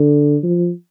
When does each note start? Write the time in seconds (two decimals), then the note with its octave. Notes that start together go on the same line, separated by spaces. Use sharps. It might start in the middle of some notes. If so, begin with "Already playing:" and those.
Already playing: D3
0.43 F3